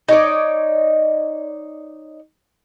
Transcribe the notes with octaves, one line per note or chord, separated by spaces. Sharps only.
D#4 C#5 D5